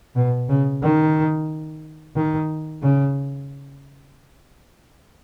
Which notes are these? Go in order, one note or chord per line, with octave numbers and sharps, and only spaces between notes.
B2
C#3
D#3
D#3
C#3